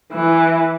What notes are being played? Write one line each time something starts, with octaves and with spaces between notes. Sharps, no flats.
E3